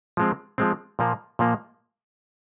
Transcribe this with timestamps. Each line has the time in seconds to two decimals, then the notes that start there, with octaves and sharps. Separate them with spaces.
0.17 F3 G#3 C4
0.58 F3 G#3 C4
0.99 A#2 F3 A#3
1.39 A#2 F3 A#3